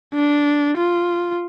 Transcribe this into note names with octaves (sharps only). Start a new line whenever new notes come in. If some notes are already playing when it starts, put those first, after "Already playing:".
D4
F4